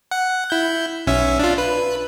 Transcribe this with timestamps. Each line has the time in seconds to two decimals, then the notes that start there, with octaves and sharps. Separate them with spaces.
0.11 F#5
0.50 E4 G6
1.07 B1 C#4 E5
1.39 D4 F4
1.58 B4